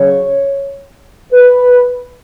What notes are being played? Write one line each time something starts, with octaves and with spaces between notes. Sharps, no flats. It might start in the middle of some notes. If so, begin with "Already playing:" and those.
Already playing: C#3 F#3 C#5
B4